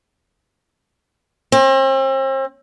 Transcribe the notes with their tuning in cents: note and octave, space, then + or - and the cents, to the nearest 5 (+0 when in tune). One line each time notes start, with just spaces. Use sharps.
C4 +40